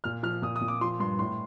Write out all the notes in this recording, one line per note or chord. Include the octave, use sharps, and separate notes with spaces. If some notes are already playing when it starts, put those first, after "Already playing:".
A#2 F6
F3 F6
A#2 D#6
D#6
A#2
D6
F3 C6
G2 C6
A2 C6